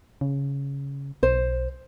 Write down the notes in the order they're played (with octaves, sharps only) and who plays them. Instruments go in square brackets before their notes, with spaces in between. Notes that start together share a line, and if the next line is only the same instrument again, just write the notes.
[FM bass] C#3
[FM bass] B1 [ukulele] C5